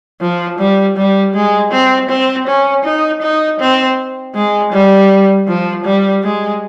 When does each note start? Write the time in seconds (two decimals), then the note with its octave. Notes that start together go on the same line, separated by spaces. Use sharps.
0.21 F3
0.59 G3
0.97 G3
1.34 G#3
1.71 C4
2.09 C4
2.47 C#4
2.84 D#4
3.22 D#4
3.60 C4
4.35 G#3
4.72 G3
5.47 F3
5.85 G3
6.23 G#3